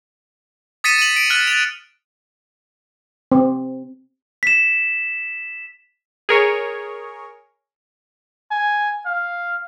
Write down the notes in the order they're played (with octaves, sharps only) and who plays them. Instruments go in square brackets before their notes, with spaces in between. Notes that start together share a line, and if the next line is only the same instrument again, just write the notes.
[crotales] D#6 A6 B6 C#7 D#7 E7
D#7 F#7
D7
F6 F#6 A6
A6 F7
[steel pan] C4
[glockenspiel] B6 E7
[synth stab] G#4 A#4 C#5
[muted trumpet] G#5
F5